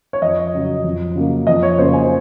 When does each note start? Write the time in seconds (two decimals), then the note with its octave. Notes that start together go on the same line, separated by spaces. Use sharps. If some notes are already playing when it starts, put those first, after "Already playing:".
0.13 C#5
0.22 F2 D#5
0.54 C#3 F#3
0.84 F2
1.15 C#3 F#3 A#3
1.47 F2 D#5
1.63 C#5
1.78 C#3 F#3 A#3 C5
1.94 G#5